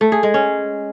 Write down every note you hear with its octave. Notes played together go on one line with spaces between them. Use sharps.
A3
G#4
G#3
C#4